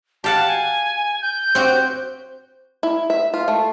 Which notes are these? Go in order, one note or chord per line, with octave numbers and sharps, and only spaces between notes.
G4 F5 F#5 A5
G#5
G6
C4 F#4 G4
E4
E5
F4
A3